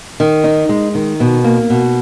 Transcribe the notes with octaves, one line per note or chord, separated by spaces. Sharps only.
D#3
D#4
G#3
D#3
B2
A#3
B2